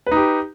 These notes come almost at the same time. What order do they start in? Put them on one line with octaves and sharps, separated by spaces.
B4 D#4 G4